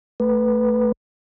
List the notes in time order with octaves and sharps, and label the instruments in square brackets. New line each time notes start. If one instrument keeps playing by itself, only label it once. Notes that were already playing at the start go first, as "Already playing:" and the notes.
[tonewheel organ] A3 B4